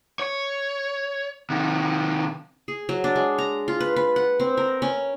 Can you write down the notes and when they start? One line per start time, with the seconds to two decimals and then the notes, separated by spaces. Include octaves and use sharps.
0.20 C#5
1.50 C3 D#3
2.68 G#4
2.89 F#3
3.04 D4
3.16 G#3
3.38 A#5
3.68 F4
3.80 B4
3.96 B4
4.16 F#5
4.40 C4
4.57 A#4
4.82 C#4